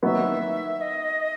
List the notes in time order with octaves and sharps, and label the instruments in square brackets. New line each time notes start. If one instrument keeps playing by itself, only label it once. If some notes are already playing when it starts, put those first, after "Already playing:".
[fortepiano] D#3 F#3 B3 D#4 F#4 [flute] E5
[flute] D#5